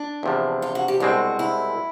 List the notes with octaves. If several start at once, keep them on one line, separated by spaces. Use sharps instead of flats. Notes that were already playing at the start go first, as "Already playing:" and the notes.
Already playing: D4
E2 C3 F3
F4
F#4
G4
C2 B2 G#3 C4 F#4
E4